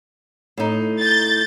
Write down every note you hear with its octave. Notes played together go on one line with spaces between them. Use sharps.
A2 D#4
G6 A6